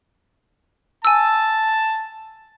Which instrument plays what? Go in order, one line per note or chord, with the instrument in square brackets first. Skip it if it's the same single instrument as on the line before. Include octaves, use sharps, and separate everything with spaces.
[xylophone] G#5 E6 [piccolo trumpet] A5